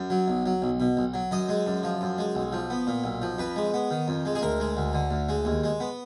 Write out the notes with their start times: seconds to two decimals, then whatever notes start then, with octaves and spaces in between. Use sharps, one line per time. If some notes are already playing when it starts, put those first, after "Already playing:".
Already playing: F#2
0.10 F#3
0.28 B1
0.46 F#3
0.62 B1
0.80 B2
0.97 B1
1.14 F#3
1.31 F#2 D#5
1.49 G#3
1.67 F#2
1.83 F3
2.01 F#2
2.18 G#3
2.35 B1
2.52 F3
2.70 B3
2.87 A#2
3.04 B1
3.22 F3
3.39 F2 B4
3.56 G#3
3.74 B3
3.90 D#3
4.08 F2
4.25 G#3
4.35 G#4
4.42 D2 A#4
4.60 G#3
4.77 D2
4.93 D3
5.11 D2
5.29 G#3
5.45 D#2
5.64 G#3
5.80 B3